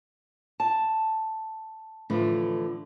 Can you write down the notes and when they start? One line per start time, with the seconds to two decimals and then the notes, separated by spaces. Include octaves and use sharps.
0.60 A5
2.10 A2 D3 E3 F3